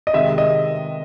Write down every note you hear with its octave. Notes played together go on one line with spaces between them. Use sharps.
D#5
C3 D#3 G#3 E5
D#5